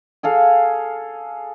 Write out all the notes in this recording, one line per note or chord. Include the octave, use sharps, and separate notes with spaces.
G#4 A4 F5